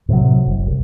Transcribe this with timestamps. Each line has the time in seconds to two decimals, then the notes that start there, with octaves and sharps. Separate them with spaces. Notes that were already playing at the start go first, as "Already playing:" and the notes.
0.09 A2 C3 E3 F#3
0.48 F#1
0.67 C2